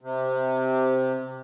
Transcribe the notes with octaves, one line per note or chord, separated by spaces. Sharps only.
C3